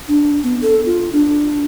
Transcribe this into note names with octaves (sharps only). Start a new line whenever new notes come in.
D4
B3
A4
F4
D4